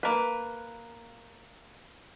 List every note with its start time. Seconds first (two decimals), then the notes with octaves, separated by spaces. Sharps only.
0.03 A#3 B4